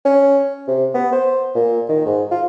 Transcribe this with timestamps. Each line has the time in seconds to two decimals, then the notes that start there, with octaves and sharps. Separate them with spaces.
0.05 C#4
0.68 C3
0.94 B3
1.12 C5
1.55 A#2
1.89 D#3
2.06 G#2
2.31 F4